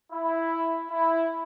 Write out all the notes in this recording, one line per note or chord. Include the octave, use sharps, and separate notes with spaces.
E4
E4